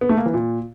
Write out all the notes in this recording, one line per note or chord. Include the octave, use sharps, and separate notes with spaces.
B3
A3
A#3
E3
A#2